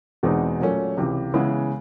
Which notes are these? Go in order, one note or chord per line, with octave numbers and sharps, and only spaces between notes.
E2 B2 G#3 C4 D#4
A#2 F#3 A3 C#4
C#2 C3 E3
C#3 E3 G#3 B3 E4